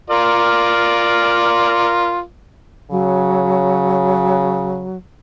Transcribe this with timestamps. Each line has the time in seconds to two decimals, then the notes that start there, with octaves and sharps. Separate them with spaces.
0.10 F4 A#4 D5
2.91 C#3 F#3